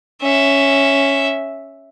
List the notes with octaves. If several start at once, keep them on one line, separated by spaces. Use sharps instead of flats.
C#4 E5